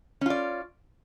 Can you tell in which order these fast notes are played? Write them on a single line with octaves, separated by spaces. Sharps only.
C#4 F4 D5